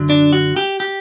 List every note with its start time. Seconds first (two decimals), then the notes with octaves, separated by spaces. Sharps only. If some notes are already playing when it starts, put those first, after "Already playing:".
Already playing: F#2 D3 F#3
0.10 D4
0.33 F#4
0.56 G4
0.80 G4